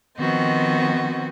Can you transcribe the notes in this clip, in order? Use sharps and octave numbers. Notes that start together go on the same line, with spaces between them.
D#3 F3 B3 C4 F#4 D#5